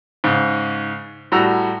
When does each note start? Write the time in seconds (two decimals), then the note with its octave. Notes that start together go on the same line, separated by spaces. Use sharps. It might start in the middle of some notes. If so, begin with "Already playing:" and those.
0.24 G#2 C#3
1.32 A2 G3 F#4 A#5 E6